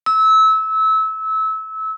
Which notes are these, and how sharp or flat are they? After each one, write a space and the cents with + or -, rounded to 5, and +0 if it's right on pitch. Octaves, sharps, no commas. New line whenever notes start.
E6 -25